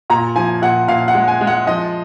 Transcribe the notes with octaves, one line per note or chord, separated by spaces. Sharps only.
A#2 A#5
F3 G#5
A#2 F#5
A#2 F5
F#5
G#3
G#5
G#3
F#5
F3 D#5